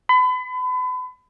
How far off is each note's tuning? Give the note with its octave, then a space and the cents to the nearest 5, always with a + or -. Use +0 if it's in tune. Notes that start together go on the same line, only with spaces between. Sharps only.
B5 +35